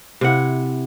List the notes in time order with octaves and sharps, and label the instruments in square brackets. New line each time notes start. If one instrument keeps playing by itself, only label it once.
[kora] C3 E4 F#5